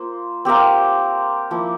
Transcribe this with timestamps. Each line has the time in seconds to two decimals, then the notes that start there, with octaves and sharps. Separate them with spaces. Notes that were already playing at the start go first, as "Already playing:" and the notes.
Already playing: A#3 F4 C5
0.45 C4 G4 A#4 F5
1.51 F3 A#3 E4